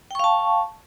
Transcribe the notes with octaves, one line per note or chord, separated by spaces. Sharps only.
F5 G5 A5 C#6